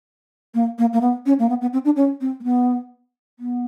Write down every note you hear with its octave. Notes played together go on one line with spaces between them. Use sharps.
A#3
A#3
A#3
B3
C#4
A#3
B3
B3
C4
D4
C#4
C4
A#3
B3
B3